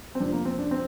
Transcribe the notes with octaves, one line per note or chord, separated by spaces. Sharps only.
C4
F2 C3 G3 D4
A#3
C4
D4
C4